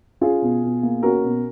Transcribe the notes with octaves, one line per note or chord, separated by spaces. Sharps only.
C#4 F4 G#4
B2
B2
A#3
C#4 F#4 A#4
B2